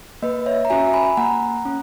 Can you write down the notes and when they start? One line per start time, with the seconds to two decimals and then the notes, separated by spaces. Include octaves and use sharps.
0.22 A#3 B4 D#5
0.46 C#5 E5
0.65 A#5
0.70 C#4 F#4 E5 G#5
0.94 G#5 B5
1.17 A#3 F#5 A#5
1.65 C#4